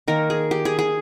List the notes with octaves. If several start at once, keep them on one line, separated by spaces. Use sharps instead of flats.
D#3 A#3 A#4
G#4
G4
G#4
G#4